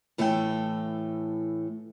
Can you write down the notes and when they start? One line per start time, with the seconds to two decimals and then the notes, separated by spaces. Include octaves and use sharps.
0.18 A2 E3 A3 A4 E5 G5